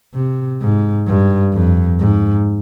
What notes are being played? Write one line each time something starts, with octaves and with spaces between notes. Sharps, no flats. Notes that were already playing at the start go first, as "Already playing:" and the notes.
C3
G#2
G2
F2
G#2